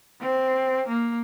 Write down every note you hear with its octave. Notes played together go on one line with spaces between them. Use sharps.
C4
A#3